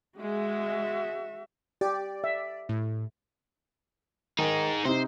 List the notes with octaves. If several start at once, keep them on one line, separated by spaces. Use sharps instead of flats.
G#3 F#4 E5
G4 D5
E5
A2
D#3 D#4 G#4
C3 D#4 C5